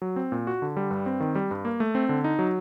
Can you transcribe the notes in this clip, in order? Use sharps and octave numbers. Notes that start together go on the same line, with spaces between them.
F#3
C4
A#2
F#4
D3
G3
G2
C4
D#3
G3
G2
A#3
A3
C4
D3
D#4
F#3